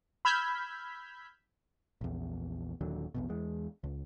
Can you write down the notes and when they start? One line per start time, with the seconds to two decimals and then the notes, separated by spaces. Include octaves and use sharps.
0.25 B5 E6 F6 G6 G#6 B6
2.01 A#1 E2
2.81 D#1 D#2 D3 F#3
3.14 A#1 E2 B2
3.30 E2 G#3
3.84 C#2